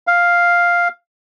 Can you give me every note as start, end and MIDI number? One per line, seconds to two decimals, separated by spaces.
0.07 0.88 77